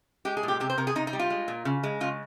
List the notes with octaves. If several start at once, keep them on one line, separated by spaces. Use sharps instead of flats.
G#3 G4
G#4
A#2 G4
C3 G4
C5
C3 A#4
G#4
C3 D#4
D#4
G3
F4
G#3
A#2
C#3
G#3
C#3 F4